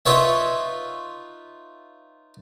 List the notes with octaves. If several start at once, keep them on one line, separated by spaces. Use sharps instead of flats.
D#4 F4 B4 C#5 E5